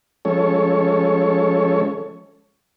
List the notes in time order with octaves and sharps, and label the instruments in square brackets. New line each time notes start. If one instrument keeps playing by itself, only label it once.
[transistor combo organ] F3 G#3 C#4 A4 C#5